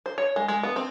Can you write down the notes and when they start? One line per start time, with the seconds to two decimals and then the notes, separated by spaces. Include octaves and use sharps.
0.06 C5
0.18 C#5
0.36 G#3
0.48 G#3
0.63 B3
0.76 C4